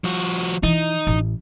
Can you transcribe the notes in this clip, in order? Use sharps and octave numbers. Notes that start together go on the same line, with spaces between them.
F3 F#4
E3 D#4
A1